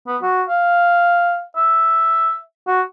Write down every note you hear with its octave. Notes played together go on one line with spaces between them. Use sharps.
B3
F#4
F5
E5
F#4